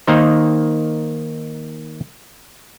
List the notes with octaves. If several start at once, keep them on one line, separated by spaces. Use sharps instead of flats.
D#3 A#3 D#4 C5